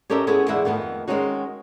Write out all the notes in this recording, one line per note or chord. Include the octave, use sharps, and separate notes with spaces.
C#4 G4 A4 A#4 D#5 E5
G#3 B3 C#4 E4 G#4 A4
E2 D3 G#3 E4 E5 F#5
F2 D#3 A3 B3
D#3 G#3 C4 C#4 D#4 F#4